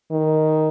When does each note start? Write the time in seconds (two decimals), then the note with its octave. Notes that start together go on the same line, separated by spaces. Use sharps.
0.11 D#3